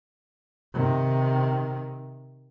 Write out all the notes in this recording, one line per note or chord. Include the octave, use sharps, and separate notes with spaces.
C3 D#3